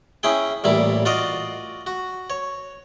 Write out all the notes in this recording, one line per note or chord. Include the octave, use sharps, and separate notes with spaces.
C#4 E4 G#4 G5
A1 A#2 G3 E4 D6
F4 F#4 D5 D#5 F5
F#4
C#5